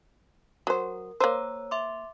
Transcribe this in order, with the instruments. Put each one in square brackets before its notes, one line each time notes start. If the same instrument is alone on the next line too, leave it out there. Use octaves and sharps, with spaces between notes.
[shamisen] F#3 C5 [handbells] A#4
[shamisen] A#3 C5 [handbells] C#5 A#5 E6
[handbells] E5 C6 D6